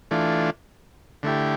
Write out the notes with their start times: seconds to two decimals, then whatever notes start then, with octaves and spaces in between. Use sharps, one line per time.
0.11 E3 A3 D4 F4
1.23 D3 A3 E4 G4